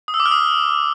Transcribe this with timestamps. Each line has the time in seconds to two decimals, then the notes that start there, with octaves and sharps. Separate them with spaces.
0.08 D#6
0.14 E6
0.20 D6
0.26 F6
0.31 D#6